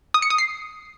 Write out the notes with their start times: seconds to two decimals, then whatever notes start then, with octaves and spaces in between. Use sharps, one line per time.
0.14 D#6
0.22 C#7
0.30 D#6
0.38 C7